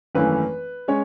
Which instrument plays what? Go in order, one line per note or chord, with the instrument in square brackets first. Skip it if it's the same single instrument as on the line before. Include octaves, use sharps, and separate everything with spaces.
[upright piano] G#1 F#2 E3 A3 C#4 B4
G#3 C#4 C#5